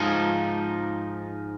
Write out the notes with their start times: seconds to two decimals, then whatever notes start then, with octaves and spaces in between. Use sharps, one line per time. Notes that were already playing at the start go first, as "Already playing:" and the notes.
Already playing: G#2 F3 D#4